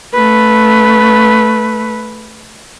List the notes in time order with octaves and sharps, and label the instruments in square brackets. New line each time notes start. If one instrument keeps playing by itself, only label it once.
[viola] A3 B4